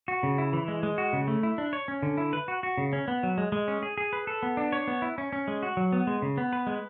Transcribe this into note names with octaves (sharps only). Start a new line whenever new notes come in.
F#4
C#3
E4
E3
G#3
G#3
F#4
C#3
A3
E4
D4
C#5
C#4
D3
E4
B4
F#4
F#4
C#3
C#4
B3
F#3
G#3
G#3
C#4
G#4
G#4
B4
A4
B3
D4
C#5
B3
E4
C#4
C#4
G#3
F#4
F#3
B3
G#3
C#3
B3
B4
G#3